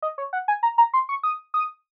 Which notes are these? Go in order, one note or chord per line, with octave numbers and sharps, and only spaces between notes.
D#5
C#5
F#5
G#5
A#5
A#5
C6
C#6
D#6
D#6